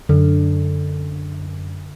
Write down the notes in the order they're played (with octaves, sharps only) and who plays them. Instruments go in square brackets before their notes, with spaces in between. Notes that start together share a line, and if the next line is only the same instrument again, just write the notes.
[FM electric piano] F#2 [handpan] D3